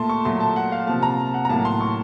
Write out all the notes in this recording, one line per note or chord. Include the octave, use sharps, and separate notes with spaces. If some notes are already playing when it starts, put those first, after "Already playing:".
Already playing: A#2 A3 A5 C6
C#6
A#2 F#3 A3 C6
A5
F#5
F5
C3 F3 A#3 A5
A#5
F#5
A#5
A2 F#3 A#3 A5
C6
C#6